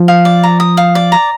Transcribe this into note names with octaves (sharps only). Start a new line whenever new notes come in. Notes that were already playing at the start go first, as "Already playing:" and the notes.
Already playing: F3
F5
D5
A#5
D#6
F5
D5
A#5